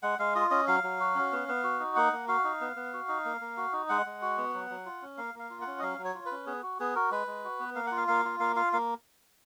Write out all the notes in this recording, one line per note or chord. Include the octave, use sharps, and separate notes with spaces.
G#3 F#5
G#3 F5
F4 D#5
C#4 D#5
F#3 F5
F#3
F#4
C#4
B3
B3
F#4
D#4
A#3 F#5
A#3
F#4 F5
D#4
B3
B3
F#4
D#4
A#3
A#3
F#4
D#4
G#3 F#5
G#3
F#4
B3
F#3
F#3
F4
C#4
A#3 F5
A#3 F5
F4
F#5
C#4
D#5
F#3 F5
F#3
C#5
F4
B4
C#4
B3 G#4
F#4
B3 G#4
F#4 A#4
G#3 B4
G#3
F#4
B3
A#3 F5
F4 F#5
F5
A#3 F5
F4
A#3 F5
F4 F5
A#3 F5